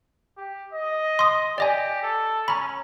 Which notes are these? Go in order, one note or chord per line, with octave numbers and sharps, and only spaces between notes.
G4
D#5
C6 D#6
G4 D5 D#5 G#5
A4
C#4 A#5 B5